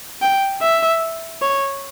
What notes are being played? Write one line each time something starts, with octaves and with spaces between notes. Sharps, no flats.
G5
E5
C#5